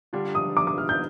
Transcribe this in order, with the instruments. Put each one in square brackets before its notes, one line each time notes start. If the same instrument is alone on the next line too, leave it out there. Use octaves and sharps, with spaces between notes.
[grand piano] D3 G3 D4 F4
[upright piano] D#6
D6
D6
F6
G6